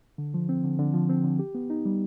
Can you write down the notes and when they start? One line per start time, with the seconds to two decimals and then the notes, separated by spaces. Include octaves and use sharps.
0.18 D3
0.34 F3
0.49 C4
0.64 D3
0.79 D3
0.94 F3
1.09 C4
1.24 D3
1.39 G4
1.55 B3
1.70 D#4
1.85 G3